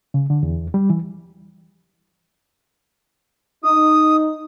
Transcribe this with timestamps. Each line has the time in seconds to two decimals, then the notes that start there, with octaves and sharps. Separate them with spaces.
0.14 C#3
0.30 D3
0.43 E2
0.74 G3
0.90 E3
3.64 D#4 D#6